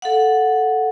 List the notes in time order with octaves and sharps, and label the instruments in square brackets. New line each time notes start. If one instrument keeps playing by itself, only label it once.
[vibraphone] A4 F5 F#5